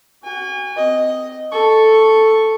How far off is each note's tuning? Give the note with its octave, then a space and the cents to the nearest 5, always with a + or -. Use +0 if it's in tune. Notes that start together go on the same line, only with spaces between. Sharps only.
F#4 +25 G#5 -35
C4 -20 D#5 +0
A4 +0 C#6 +0